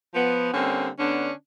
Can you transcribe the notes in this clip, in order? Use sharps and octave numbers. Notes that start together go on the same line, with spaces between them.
F3 B3
D3 G3 A#3 C4 C#4
D3 B3 C#4 D4